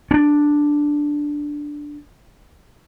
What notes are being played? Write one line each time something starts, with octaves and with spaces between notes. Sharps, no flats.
C#4 D4